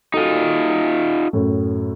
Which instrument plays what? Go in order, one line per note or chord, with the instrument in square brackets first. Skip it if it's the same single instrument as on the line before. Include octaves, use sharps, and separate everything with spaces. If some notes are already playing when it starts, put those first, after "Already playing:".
[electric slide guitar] D#4 F4 [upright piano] F#4 A4
[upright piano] F#2 A2